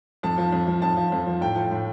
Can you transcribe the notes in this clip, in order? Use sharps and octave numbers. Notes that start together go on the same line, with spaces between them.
F2 A5
F3
F2
F3
F2 A5
F3
F2
F3
A2 G5
F3
A2